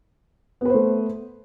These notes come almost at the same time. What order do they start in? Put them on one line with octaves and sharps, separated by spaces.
B3 B4 C5 A3